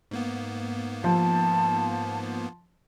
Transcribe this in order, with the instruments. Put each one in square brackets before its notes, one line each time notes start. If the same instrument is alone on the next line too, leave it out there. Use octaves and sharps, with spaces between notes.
[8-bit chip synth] G#2 A#3 B3
[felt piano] F3 [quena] A5